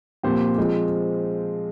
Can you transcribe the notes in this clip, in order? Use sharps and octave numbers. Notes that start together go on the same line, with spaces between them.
A#2 F3 C4 G4 C5
F3 G#3 C4 F4